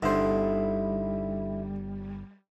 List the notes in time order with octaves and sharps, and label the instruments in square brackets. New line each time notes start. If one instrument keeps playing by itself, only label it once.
[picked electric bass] G1 [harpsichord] D3 C5 [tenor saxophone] G3 [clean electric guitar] D#4 E4 A4